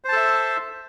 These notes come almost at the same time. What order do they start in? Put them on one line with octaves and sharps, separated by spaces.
C5 A5 A4 E5